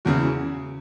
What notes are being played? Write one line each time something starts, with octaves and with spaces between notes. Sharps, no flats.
E2 C#3 E3 F#4